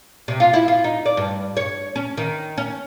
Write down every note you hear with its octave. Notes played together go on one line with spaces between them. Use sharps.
C3
F4
E4
F4
D#4
D5
G2
C#5
C#4
D#3
C#4